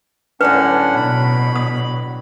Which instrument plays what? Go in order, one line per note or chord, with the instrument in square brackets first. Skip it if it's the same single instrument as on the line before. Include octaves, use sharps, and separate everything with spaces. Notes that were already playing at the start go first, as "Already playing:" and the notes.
[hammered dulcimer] A2 D3 F#3 [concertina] C#4 D4 F#5 [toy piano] B4
[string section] B2 [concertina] B5
[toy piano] D#6